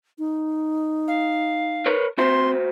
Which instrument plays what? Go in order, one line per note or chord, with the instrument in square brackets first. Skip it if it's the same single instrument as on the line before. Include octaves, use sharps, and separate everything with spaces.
[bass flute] D#4
[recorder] F5
[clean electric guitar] A#4 B4 C#5
[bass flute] C4 [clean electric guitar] F#4 C5 E5 [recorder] C6